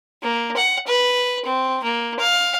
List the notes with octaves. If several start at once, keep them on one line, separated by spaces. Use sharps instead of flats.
A#3
F#5
B4
C4
A#3
F5